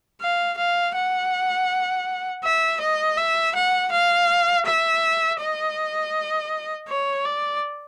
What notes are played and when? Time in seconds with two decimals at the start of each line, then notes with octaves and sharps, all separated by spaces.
0.21 F5
0.58 F5
0.96 F#5
2.44 E5
2.81 D#5
3.17 E5
3.55 F#5
3.92 F5
4.66 E5
5.40 D#5
6.89 C#5
7.25 D5